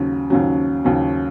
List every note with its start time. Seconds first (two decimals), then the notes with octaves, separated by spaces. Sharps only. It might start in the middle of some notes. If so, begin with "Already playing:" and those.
Already playing: D#2 C#3 F#3
0.30 D#2 C#3 F#3
0.84 D#2 C#3 F#3